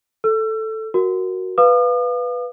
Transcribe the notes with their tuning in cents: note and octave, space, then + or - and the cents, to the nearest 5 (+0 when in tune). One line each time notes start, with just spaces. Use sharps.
A4 +0 E6 +35
F#4 +0 A#4 +0
B4 +0 F5 +0 D#6 -45